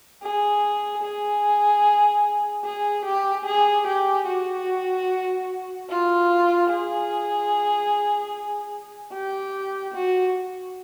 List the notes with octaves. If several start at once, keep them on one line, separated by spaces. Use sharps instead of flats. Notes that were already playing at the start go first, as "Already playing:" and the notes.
G#4
G#4
G#4
G4
G#4
G4
F#4
F4
G#4
G4
F#4